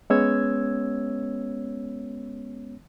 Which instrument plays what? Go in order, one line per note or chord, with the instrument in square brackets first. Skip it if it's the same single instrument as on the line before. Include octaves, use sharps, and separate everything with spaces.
[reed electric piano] G#3 B3 C#4 C#5 E6 G#6